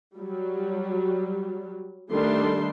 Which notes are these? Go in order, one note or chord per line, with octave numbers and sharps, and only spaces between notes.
F#3 G3
D#3 G3 A3 D4 A4 C6